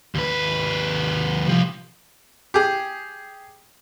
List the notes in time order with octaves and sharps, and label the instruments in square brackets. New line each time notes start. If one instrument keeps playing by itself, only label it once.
[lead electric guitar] D#2 B4
C2 F3
[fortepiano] G4 G#4